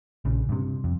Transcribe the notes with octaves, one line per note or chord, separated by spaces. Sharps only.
A#1 C#3
G2 C3
F2